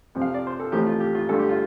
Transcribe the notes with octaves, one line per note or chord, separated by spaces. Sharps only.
F2 C3 F3
F5
D5
C5
A4
A1 A2 F3 A3 C4 G4
F4
G4
F4
G2 D3 A3 A4
G4
F4